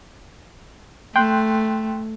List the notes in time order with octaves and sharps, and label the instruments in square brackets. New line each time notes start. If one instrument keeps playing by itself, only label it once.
[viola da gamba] A3 [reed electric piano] G5 C6 F#6